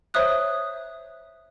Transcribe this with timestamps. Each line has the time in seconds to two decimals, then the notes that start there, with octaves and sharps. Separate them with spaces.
0.14 C5 C#5 E5 D#6 F#6